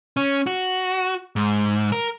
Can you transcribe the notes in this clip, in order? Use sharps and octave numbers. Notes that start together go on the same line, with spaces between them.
C#4
F#4
G#2
A#4